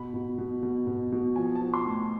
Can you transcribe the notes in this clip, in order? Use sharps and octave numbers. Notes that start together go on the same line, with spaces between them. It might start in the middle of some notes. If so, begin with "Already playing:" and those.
Already playing: B2 B5
B2
B2
B2
B2
B2
F3 G#5
A5
F3
C6
A2